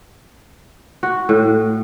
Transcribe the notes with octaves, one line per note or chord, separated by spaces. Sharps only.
F#4
A2